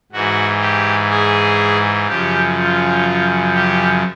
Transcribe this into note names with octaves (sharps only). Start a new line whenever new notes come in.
G#2 E3 F#4
G4
G#4
F#2 C#3 F3 G4
F4
G4